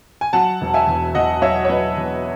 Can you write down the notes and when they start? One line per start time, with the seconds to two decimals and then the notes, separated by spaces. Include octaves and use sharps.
0.21 G#5
0.33 F#3 F#5 A5
0.61 E1
0.74 E5 G#5
0.87 E2
1.15 E1 D#5 F#5
1.42 F#3 C#5 E5
1.65 C#5
1.69 F#3 B4 D#5
1.97 E2